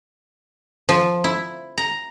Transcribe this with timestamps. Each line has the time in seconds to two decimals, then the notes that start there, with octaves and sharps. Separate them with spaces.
0.89 F3
1.24 E4
1.78 A#5